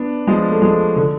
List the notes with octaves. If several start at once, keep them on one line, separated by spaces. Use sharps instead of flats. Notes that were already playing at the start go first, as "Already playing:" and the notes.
Already playing: B3 D4
F3 G#3
A3
F3 G#3
D3